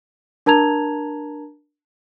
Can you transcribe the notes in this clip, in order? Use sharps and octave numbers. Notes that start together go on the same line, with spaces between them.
D4 A#4 A5 A#5 G#6 F7